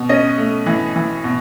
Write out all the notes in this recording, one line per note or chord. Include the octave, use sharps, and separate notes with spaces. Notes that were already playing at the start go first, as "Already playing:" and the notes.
Already playing: B2
C#4 D#5
A3
E3
E3
B2